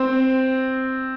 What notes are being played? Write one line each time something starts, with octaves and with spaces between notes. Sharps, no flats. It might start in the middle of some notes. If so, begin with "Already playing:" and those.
Already playing: C4